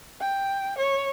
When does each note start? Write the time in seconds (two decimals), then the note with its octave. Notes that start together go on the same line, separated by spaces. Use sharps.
0.21 G5
0.78 C#5